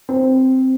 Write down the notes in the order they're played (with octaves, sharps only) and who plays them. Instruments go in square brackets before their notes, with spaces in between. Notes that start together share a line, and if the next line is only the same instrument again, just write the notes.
[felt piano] C4